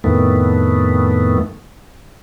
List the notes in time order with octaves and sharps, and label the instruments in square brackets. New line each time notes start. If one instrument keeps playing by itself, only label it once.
[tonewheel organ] F2 A2 D#3 A3 B3